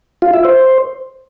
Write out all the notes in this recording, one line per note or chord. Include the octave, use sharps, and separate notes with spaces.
F4
E5
C5